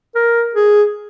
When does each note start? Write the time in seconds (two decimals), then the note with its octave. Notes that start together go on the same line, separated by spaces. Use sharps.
0.15 A#4
0.55 G#4